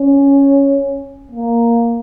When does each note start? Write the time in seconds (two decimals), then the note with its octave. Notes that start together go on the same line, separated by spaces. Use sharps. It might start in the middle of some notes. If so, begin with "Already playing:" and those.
Already playing: C#4
1.31 A#3